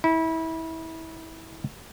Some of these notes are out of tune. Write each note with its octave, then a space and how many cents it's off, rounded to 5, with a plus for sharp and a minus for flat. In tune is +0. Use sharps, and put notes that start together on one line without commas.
E4 -25